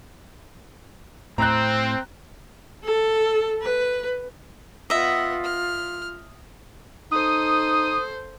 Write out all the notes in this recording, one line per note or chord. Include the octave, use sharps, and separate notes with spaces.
A2 C4 A#5 F#6
A4
B4
B3 F4 D#5 E5 F#5
F6
D#4 A4 C5 D#6